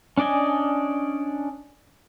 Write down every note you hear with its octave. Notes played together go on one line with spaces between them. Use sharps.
C#4 D4 D5 D#5 G#5